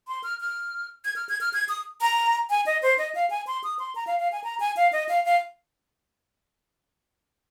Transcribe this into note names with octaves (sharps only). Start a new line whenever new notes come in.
C6
F6
F6
G#6
F6
G#6
F6
G#6
D#6
A#5
G#5
D#5
C5
D#5
F5
G#5
C6
D#6
C6
A#5
F5
F5
G#5
A#5
G#5
F5
D#5
F5
F5